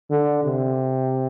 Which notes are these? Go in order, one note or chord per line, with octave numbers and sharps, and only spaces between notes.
D3
C3